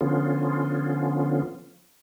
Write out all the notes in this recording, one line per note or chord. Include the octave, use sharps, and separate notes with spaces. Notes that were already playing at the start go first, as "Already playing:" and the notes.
D3 F3 B3 C#4 F4